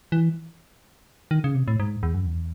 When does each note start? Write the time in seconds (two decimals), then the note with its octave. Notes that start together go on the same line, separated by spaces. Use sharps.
0.12 E3
1.31 D#3
1.44 C#3
1.55 C3
1.68 A2
1.80 G#2
2.03 E2
2.14 F#2
2.26 E2